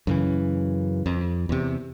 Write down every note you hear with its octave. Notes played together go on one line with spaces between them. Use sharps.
F#2 C#3 E3
F2
E2 C3